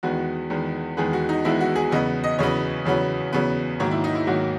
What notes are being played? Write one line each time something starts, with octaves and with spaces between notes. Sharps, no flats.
E2 D#3 G#3 B3 F#4
E2 D#3 G#3 B3
E2 D#3 G#3 B3 G#4
F#4
D#4
E2 D#3 G#3 B3 E4
F#4
G#4
E2 C#3 F#3 B3 D#5
D#5
E2 C#3 F#3 B3 C#5
E2 C#3 F#3 B3
E2 C#3 F#3 B3
G#2 D#3 F#3 A#3 C#5
E4
D#4
E4
G#2 D#3 F#3 A#3 F#4